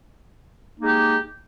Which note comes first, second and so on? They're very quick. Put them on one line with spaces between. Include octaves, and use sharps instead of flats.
A#3 D#4 G#3 G4